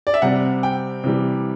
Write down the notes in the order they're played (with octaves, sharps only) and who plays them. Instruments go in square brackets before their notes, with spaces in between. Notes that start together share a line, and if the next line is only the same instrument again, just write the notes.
[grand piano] D5
E5
C3 G3 C4 F#5
G5
C3 E3 G3